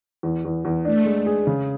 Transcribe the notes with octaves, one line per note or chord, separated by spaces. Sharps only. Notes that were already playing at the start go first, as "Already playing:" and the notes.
E2
E2
E2
A3 D4
G#3
G#4
C#3